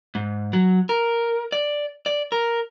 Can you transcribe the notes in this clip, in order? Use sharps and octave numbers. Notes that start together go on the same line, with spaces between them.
G#2
F#3
A#4
D5
D5
A#4